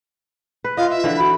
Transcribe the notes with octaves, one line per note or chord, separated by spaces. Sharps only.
B4
F4 D#5 F5
E5
D3 E3 F3
F#4 B5